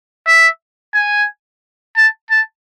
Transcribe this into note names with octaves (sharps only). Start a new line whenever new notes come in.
E5
G#5
A5
A5